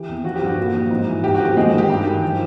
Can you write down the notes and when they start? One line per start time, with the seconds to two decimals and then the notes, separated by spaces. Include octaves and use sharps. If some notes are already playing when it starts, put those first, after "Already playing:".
Already playing: E3 G4
0.09 E2
0.24 F3 F#4
0.36 G4
0.41 G2 F#4
0.58 A#2
0.74 F3
0.91 G#2
1.07 E3
1.24 G#2 G4
1.34 F#4
1.40 F3
1.45 G4
1.56 G#2 G#3 G#4
1.74 D#3 G4
1.90 G2
2.06 D#3
2.23 F3